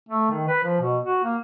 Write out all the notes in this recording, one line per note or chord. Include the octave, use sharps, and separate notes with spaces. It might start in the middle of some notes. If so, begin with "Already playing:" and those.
A3
D#3
B4
F3
B2
F#4
A#3